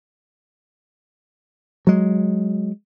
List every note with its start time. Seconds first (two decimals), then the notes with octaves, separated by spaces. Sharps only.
1.87 F#3 G#3